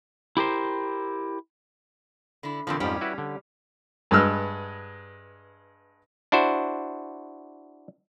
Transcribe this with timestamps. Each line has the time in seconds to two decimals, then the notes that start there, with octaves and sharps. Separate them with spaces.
0.37 E4 G4 A#4 C5
2.43 D3 E4
2.67 E2 A#2 D3 F3 C4
2.80 F2 G#2 F3 G3 C#4 G4
3.01 E4 F#4 B4
3.18 D3
4.11 G2 G#3 B4 E6 F6
6.32 D4 E4 F#4 C5